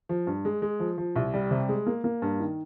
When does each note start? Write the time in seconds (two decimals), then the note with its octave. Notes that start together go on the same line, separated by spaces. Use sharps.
0.09 F3
0.27 G2
0.45 G#3
0.62 G#3
0.80 F3
0.98 F3
1.16 C2
1.34 G3
1.51 C3
1.69 G#3
1.87 A#3
2.04 A#3
2.22 G2
2.40 D#3